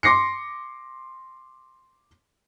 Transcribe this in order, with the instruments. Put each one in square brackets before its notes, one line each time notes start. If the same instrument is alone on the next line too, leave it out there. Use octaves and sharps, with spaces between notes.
[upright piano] C6 D6 A#6 C7 C#7